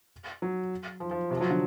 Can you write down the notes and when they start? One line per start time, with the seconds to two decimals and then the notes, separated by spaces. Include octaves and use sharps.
0.42 F#3
1.00 F3
1.11 F3
1.31 C3
1.36 F3
1.41 F#3
1.50 D3